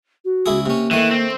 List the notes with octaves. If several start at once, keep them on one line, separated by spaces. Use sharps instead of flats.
F#4
C#2 E4 G#4
C3 A#3 C#4
D#3 E3 A3
C4